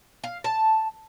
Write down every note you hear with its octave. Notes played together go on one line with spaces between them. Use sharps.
F5
A5